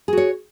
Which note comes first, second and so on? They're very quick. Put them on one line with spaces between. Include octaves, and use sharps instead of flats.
G#4 F#4 C#5